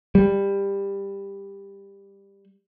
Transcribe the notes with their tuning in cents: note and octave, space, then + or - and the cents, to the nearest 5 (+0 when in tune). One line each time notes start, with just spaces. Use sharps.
G3 +15